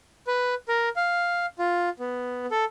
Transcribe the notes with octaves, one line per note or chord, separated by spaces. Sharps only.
B4
A#4
F5
F4
B3
A4